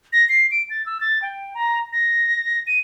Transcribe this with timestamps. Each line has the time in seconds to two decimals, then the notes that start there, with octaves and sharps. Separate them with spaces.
0.13 A#6
0.29 C7
0.51 D7
0.70 A6
0.86 E6
1.01 A6
1.22 G5
1.54 A#5
1.93 A#6
2.67 D#7